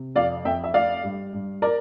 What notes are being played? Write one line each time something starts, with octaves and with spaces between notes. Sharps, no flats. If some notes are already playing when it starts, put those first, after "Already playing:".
Already playing: C3
F2 D5 F5
F2 E5 G5
E5
A3 D5 F5
G2
G2
A#4 D5